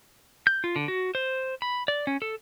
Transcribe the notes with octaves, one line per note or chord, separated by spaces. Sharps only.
G6
F4
D3
F#4
C5
B5
D5
C#4
A4